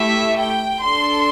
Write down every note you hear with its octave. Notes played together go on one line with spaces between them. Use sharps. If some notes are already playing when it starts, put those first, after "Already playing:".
Already playing: A3 E4 G4 E5
G5
D4 A4 C6